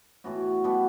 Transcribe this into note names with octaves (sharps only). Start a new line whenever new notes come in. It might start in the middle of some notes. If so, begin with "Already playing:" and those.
A2 E3 B3 F#4
B2 G3 B3